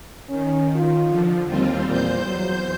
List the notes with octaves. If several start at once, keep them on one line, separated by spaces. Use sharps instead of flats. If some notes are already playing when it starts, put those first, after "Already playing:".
D#3 C#4
F4
D3 F3
D#2 G3 C4 F4
E2 A#2 C5 G6
F#3